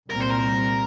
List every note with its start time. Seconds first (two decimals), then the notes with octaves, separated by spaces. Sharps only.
0.10 C2 A#2 G3 C4 A#4
0.20 C5
0.30 A#4